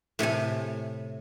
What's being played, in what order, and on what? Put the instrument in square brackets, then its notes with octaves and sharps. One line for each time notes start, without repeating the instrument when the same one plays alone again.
[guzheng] A2 C3 A4 G#5